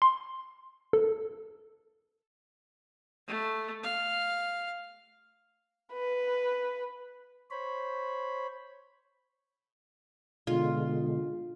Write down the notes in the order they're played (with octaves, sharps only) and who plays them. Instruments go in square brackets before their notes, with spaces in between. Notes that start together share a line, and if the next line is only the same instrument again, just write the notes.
[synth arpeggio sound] C6
A4
[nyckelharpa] A3
F5
[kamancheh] B4
[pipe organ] C5 C#5 B5
[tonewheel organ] B2 D3 G#3 [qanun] F4